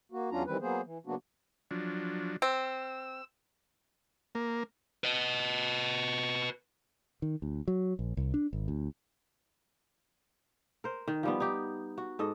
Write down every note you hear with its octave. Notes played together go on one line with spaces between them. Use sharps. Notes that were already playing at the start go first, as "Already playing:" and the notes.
A#3 F#4
E2 F#3 C#4 D4 F4 A#5
D#3 E3 G3 C4 B4
F#3 A#3 B3 G#4 C5
E3
C#3 F#3 A#3 B3 D4 F#4
F3 F#3 D4
C4 E6
A#3
B4 D#5
D#3
D2
F#3
A#1
C2
D4
G#1
D2
A#4 C5
D#3
F3 G3 B3
D#4 G4
F#4
G#2 A4 D#5